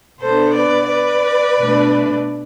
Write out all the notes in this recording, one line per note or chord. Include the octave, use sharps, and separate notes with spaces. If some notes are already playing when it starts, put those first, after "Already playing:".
B2 B3 D4 A4 C5
B4 D5
B4 D5
B2 A3 D4